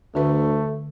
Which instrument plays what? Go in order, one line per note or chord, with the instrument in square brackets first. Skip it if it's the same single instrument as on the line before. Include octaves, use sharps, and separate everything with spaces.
[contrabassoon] D2 [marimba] D3 B4 [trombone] A3